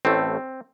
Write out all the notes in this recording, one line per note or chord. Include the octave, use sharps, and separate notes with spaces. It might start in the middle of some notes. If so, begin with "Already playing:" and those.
A1 A2 A3 C4